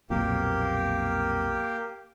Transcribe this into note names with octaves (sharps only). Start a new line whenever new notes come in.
B1 F2 A#2 A#3 G4